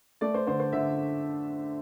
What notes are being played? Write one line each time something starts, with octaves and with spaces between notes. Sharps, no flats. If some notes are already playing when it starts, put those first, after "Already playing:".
A3 D5
C5
D3 C5
C5
D3 E5